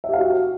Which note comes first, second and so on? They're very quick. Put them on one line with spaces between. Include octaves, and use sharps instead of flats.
E5 G4 F5 F#4